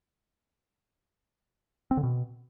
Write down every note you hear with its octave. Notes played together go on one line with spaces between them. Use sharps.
C4
D3
B2